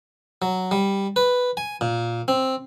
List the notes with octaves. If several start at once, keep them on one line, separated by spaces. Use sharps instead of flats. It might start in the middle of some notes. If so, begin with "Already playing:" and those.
F#3
G3
B4
G#5
A#2
C4